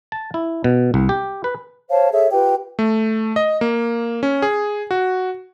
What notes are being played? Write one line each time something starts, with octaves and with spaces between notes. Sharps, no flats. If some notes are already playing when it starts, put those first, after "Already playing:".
A5
E4
B2
C2
G4
B4
C5 C#5 F5 A5
G#4 A4 C#5 E5
F4 G4 B4 G5
A3
D#5
A#3
C#4
G#4
F#4